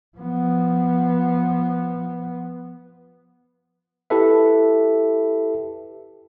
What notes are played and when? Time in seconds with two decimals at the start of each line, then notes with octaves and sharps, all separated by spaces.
0.18 F3 B3
4.10 E4 G4 A4 B4 E5